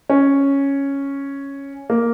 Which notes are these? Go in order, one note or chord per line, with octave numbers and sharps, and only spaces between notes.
C#4
A#3